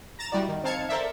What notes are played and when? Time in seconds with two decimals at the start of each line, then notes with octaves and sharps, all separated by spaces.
0.19 A#5 A6 E7
0.32 G3 E4 F#4 D5
0.48 D#3
0.64 C4 D#4 F5 A5 G#6 C#7
0.89 A4 A#4 C5 D5 E5